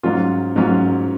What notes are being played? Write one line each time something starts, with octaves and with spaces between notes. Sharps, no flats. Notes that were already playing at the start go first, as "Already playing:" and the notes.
G#2 F#3 C#4 F4
G#2 F#3 C#4 F4